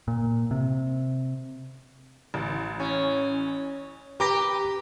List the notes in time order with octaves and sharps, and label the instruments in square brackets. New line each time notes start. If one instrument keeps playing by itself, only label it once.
[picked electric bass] A#2
C3
[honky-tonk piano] A1
[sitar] C#4
[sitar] G4 [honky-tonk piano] B4 [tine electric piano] A#5 D6 A#6